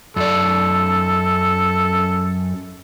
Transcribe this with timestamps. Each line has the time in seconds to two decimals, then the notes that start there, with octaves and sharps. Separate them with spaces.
0.16 F#2 A4 D5